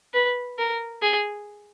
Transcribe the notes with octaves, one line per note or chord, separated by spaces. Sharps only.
B4
A#4
G#4